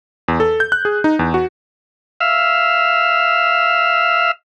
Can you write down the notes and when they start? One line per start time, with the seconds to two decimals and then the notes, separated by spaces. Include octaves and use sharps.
0.28 E2
0.40 A4
0.60 G6
0.72 F#6
0.85 G#4
1.04 D#4
1.19 E2
1.34 F#4
2.20 E5 F5